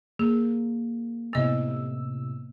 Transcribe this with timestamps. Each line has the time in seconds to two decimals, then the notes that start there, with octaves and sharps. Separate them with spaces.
0.19 A#3 G#4
1.33 A2 C3 B3 D#5 E6